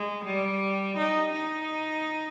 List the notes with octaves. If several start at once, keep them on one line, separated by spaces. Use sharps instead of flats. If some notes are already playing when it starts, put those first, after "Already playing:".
Already playing: G#3
G3
D#4
D#4